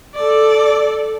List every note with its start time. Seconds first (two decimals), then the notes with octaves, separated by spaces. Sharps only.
0.15 A4 D5